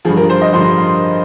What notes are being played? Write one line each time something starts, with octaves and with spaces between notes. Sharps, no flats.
G2 D3 F3 G#4
A#4
C5
D#5
G2 D3 F3 C6
C6